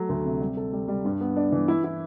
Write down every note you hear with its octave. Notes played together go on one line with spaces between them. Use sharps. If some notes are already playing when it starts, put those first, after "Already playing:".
Already playing: F#3 A3
D2
C3
G3
A4
G3
G3
G2
B3
D4
E3
E4
E4